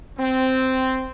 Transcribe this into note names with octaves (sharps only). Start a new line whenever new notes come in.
C4